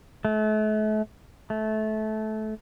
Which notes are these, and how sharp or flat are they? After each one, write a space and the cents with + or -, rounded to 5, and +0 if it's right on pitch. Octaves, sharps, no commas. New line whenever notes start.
A3 -40
A3 -20